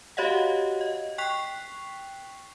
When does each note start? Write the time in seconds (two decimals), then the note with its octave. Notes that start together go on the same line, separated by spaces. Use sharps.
0.17 F#4 G4 C#5 D#5 F5 F#5
0.81 D#5
1.18 G5 C#6 F#6 B6 C7 F7